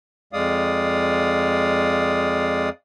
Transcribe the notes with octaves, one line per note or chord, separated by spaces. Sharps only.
F2 G#3 D5 F5 D#6